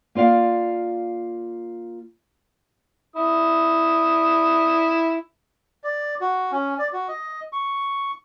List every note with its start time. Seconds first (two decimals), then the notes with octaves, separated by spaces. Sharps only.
0.15 A#3 F4 D5 F5
3.16 E4 D#6
5.84 D5
6.21 F#4
6.52 C#4
6.79 D5
6.93 F#4
7.08 D#5
7.53 C#6